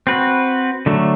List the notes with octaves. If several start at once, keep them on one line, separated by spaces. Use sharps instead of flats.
C4 F#4 B4
D3 F#3 A3